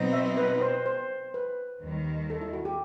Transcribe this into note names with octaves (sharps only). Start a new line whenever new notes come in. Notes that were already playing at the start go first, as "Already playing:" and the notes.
Already playing: B2 F#3 C4 D#4
E5
B4
B4
C5
C5
B4
D#2 D#3 G3
A4
E4
F#4
G4